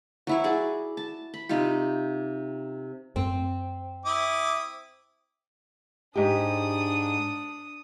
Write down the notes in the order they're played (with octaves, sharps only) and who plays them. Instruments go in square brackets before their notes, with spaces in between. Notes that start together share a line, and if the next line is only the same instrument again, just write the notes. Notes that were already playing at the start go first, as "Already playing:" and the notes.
[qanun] F#3 E4 C#5
F#4 G#4 D5
A5
B5
C3 D#4 F4 G4
[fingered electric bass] F#2 [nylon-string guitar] C4
[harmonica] E4 D6 D#6
[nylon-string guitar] G#2 G4 [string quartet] D4 D#6